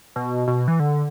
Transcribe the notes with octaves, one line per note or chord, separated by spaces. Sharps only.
B2
B2
E3
D3